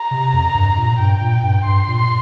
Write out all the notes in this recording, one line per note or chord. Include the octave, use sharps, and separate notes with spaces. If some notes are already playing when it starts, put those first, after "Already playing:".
Already playing: A#5
C3
F2
G2
A#2
G2 G5
A#2
G2
G2 C6
A#2